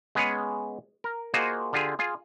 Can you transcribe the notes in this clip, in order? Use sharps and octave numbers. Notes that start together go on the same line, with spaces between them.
G#3 B3 C#4 G#4 B4 C#5
A#4
A#3 F4 F#4 G#4 C5 D#5
D3 F4 G4 G#4
F4 G#4